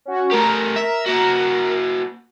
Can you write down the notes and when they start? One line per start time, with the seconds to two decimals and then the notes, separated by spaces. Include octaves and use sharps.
0.05 C#4 F#4
0.32 A3 G4 A#4 A#5
0.76 E5
1.06 A#3 F#4